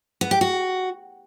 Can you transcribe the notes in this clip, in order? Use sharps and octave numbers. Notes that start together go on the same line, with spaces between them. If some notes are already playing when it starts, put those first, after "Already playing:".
B3
G4
F#4